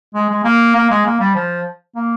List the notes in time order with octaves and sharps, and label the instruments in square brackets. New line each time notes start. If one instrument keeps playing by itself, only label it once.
[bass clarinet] G#3
G#3
A#3
A#3
G#3
A#3
G3
F3
A#3